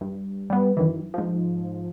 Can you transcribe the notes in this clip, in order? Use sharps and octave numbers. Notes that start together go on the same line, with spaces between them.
G2
G3 B3
F#2 D#3 E3
G#2 F3